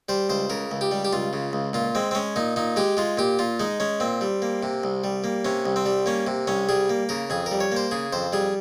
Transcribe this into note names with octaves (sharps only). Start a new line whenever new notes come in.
G3 C5
C#2 C5
C#3 A#4
C#2
G4
G3
G4
C#2 F4
C#3
C#2
A#2 F4
G#3 C4
C4
G#3 C#4
A#2 D#4
A#2 D#4
G#3 G4
G#3 F4
A#2 G4
A#2 F4
G#3 D#4
G#3 C#4
A#2 C4
G3
A#3
C3
C2
G3
A#3
C3 C#4
C2
C4
G3
A#3 C#4
C3
C2 C#4
G3 G#4
A#3
C#3 A#4
F2 G#4
A#4
G3
C#5
A#3 C5
C#3 G#4
F2 C5
G3 G#4